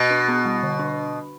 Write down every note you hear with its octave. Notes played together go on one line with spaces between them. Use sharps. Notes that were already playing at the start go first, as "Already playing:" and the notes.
Already playing: B2
D4
B3
G3
D3
D4